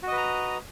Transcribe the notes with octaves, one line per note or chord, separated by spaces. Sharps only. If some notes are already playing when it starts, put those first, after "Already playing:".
F#4 B4 D#5 A#5